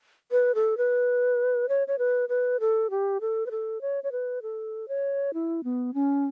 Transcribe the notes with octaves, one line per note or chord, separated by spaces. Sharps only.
B4
A4
B4
C#5
C#5
B4
B4
A4
G4
A4
B4
A4
C#5
C#5
B4
A4
C#5
E4
B3
C#4